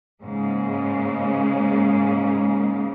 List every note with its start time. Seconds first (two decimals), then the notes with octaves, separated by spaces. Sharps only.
0.22 G#2 C#3 G#3 A#3